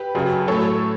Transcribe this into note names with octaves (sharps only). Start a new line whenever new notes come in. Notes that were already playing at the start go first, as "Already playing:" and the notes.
Already playing: G4 B4
F#2 C#3 F#3
A2 F#3 A4 C#5